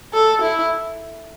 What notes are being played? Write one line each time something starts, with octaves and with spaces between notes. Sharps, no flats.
A4
E4